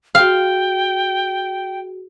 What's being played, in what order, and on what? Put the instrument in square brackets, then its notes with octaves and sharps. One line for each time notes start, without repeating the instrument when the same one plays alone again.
[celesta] F#4 G#4 [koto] F5 [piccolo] G5